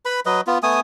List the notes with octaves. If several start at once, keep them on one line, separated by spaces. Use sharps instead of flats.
B4 B5
F#3 B4 D#5
B3 F4
A3 B3 G#5 D#6